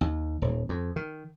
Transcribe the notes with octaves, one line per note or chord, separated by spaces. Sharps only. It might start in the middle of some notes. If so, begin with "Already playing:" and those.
D#2
D#1
F2
D#3